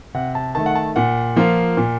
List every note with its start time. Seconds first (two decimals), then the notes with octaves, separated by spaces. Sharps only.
0.14 C3 F#5
0.35 A5
0.55 D#3 A3 A5
0.66 F#5
0.75 A5
0.96 A#2 F#5
1.36 F3 A#3 F4
1.77 A#2